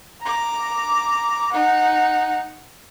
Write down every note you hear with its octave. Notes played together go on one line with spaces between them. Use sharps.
A#5 D6
D#4 F#5